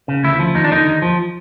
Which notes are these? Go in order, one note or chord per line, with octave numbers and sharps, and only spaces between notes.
C#3
D2 E4
F3
D#2 D#4
D4
D3 D#4
D#2
F3